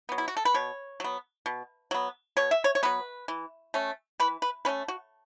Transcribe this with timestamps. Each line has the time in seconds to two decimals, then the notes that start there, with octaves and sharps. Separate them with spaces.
0.09 F#3 B3
0.18 E4
0.28 F#4
0.37 A4
0.45 B4
0.54 B2 C#5
1.00 F#3 B3
1.46 B2
1.91 F#3 B3
2.37 B2 C#5
2.51 E5
2.64 C#5
2.75 C#5
2.83 F#3 B3 B4
3.28 E3
3.74 A3 C#4
4.20 E3 B4
4.42 B4
4.65 A3 C#4 B4
4.88 F#4